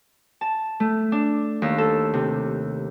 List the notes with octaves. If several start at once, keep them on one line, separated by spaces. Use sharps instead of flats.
A5
A3
D4
D#2
A4
C3